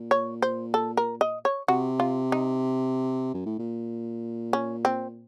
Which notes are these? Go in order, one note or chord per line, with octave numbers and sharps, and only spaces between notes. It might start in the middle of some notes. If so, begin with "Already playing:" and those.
Already playing: A#2
C#5
C5
A4
A#4
D#5
C#5
C3 F#4
F4
D#4
F#2
A2
A#2
C#4
C4